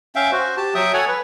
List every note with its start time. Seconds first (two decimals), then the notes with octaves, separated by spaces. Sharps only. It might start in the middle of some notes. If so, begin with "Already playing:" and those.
0.15 C#4 E5 F5 G5
0.32 F#4 C5
0.57 G4 A5
0.75 F#3 E5 G5 D#6
0.93 A4 C#5 F#5 G#5
1.08 B4